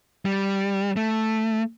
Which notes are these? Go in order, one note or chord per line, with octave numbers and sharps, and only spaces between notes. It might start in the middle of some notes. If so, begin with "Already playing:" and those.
G3
A3